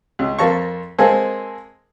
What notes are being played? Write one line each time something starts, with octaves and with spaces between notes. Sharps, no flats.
C#2
F2 A#3 C5 A5 A#5 C#6
G#3 A#3 C4 G#4 A4 C5